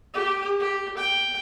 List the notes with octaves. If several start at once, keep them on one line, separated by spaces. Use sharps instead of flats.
G4
G4
G5